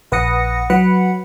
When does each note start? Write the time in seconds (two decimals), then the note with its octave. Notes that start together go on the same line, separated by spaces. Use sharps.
0.12 A#1 B4 F#5 D#6 A#6 C#7
0.70 F#3 B4 F#5 B5 C#7